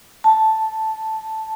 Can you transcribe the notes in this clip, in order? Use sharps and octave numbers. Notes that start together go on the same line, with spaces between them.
A5